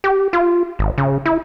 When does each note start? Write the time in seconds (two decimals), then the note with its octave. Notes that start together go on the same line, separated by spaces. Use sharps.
0.04 G4
0.33 F4
0.79 G#1
0.98 C#3
1.26 E4